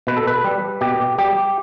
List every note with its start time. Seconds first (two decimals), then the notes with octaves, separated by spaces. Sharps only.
0.07 B2 B4
0.17 A4
0.27 B4
0.44 G3
0.81 B2 G4
1.18 G3 G4